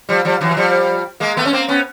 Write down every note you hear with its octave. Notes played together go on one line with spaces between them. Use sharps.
F3 G3
F3 G3
E3 F#3
F#3
F3 G3
G#3 A#3
A3 B3
C#4
A#3 C4
B3 C#4